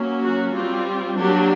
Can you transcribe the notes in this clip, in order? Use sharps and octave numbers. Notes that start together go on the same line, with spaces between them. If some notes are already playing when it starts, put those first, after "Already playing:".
Already playing: F#3 A#3 C#4
F#4
G3 C4 F4
F#3 A#3 D4 G4